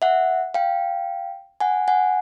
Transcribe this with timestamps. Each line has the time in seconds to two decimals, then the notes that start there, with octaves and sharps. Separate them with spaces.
0.02 E5 F#5
0.54 F5 G5
1.60 F#5 G#5
1.88 F#5 G#5